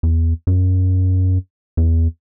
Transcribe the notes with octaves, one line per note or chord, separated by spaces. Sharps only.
E2
F#2
E2